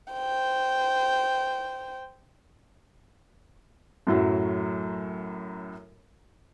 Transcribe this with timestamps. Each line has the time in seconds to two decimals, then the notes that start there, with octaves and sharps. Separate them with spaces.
0.13 C5 G5
4.07 F#2 A2 F#3